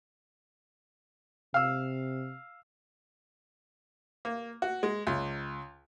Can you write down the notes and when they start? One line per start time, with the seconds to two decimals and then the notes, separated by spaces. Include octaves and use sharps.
1.54 C3 F5 E6
4.25 A#3
4.62 F#4
4.83 G#3
5.07 C#2